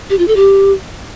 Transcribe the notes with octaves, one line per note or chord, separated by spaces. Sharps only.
G4
F4
A4
G4